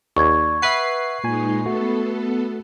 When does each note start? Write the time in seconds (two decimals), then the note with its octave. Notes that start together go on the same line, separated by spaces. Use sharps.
0.16 D#2 D5 C#6 G#6
0.62 B4 E5 F#5 C7
1.24 A#2 G#3 D#4 G#5
1.66 A3 B3 F#4 A4